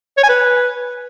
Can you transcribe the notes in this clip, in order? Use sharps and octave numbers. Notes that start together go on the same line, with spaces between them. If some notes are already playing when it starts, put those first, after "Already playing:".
C#5
G#5
B4